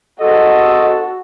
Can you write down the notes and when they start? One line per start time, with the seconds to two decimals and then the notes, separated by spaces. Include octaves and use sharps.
0.20 G#2 C3 F#4 A4 D#5